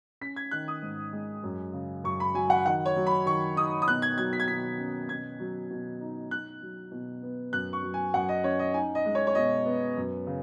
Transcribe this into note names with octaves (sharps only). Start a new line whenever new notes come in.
C#4 B6
G#6
D#3 F#6
D#6
G#2
G#3
F#2
C#3
F#2 C#6
B5
F#3 G#5
F#5
D#3 F#5
C#5
F#3
B5
D#3 C#6
D#4 D#6
D#6
B2 F#6
G#6
F#3 G#6
B6
G#6
B2 B6
C#4
B2 G#6
F#3
B2
D#4
D#4 F#6
F#3
B2
B3
F#2 F#6
C#6
F#3
G#5
F#2 F#5
D#5
C#4 C#5
D#5
D#4 G#5
D#5
G#3
C#5
C#5
B2 D#5
B3
F#2
C#3